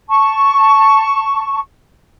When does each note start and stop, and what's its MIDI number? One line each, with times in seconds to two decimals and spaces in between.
0.08 1.60 81
0.08 1.60 85